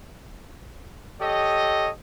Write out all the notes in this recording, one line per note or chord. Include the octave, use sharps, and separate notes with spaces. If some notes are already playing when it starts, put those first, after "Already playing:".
G4 A4 C#5 D#5